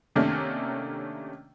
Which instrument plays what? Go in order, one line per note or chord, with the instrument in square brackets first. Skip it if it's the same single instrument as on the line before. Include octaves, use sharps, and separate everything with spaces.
[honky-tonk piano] C3 D#3 A3 A#3 C#4 D4